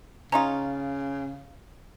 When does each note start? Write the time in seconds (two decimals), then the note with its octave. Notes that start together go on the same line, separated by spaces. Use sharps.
0.32 C#3 C#4 D#4 F4 A#5